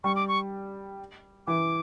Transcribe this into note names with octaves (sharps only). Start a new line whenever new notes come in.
G3 C#6
D6
C#6
E3 D6